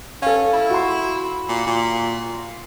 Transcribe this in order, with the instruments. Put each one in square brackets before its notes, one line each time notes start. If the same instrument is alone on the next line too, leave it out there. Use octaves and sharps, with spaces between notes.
[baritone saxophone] C#4 [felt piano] A4 F5
[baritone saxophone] E4
[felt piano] F#4 C6
[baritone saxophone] A#2
A#2